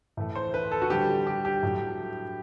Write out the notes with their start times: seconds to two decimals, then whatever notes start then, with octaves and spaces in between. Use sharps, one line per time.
0.17 A2 E3 A3
0.35 C5
0.54 B4
0.71 A4
0.82 F#4
0.90 D3 G3 G4
1.27 G4
1.45 G4
1.63 A2 F#3 A3